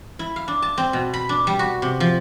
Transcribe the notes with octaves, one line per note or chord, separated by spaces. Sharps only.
E4
F5
D4
A5
C4
B2
B5
D4
G3
F#4
C3
F3